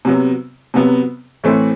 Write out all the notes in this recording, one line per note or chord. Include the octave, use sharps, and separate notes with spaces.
C3 F#3 B3
C3 F#3 B3
A2 E3 A3 C4